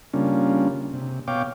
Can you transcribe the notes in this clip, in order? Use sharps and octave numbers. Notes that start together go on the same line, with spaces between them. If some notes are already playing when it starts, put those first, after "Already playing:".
C#3 G3 A#3 C#4 D4 F4
C3
B2 C#5 F5 G5 D6